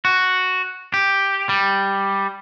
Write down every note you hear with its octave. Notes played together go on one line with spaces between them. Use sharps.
F#4
G4
G3